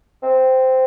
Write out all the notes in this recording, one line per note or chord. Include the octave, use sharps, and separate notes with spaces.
C4